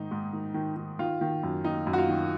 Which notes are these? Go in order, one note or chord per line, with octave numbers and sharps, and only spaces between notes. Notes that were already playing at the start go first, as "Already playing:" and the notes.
Already playing: G#2 D#3 D#4
G#2
D#3
D#3
D#3
D#3 F4
D#3
F#2
D#3 D#4
F#2
F#4
F4
D#3